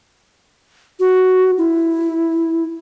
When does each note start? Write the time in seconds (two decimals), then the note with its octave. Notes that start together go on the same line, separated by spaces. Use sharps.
1.00 F#4
1.58 E4